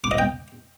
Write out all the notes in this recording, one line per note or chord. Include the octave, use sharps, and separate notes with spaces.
D6
D#5
G5